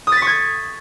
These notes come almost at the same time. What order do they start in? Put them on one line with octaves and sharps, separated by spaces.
D#6 A6 B6 C#6 G#6